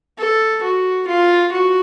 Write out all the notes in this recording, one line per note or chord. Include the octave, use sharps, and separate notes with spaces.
A4
F#4
F4
F#4